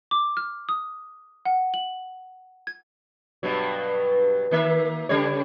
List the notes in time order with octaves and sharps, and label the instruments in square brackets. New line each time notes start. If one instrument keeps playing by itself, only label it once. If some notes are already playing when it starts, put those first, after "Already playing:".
[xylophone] D6
F6
D#6
F#5
F#7
G#6
[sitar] G2 B2 F#3
D#3 A#3 E5
C#3 G3 C#5